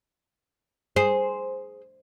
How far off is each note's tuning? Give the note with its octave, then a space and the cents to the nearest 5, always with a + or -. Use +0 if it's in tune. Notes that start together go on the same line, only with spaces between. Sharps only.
G#4 +0 C5 -5